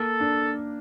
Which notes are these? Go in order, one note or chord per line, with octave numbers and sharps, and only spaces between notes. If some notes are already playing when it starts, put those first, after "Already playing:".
Already playing: A#3 A4
D4